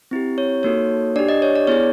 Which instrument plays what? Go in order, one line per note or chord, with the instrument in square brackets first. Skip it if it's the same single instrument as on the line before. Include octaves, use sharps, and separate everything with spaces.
[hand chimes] C4 E4 G4
C#5
A#3 D#4 F#4 A4 C#5
D4 G4 D5
D#5
C#5
D5
B3 E4 G#4 C#5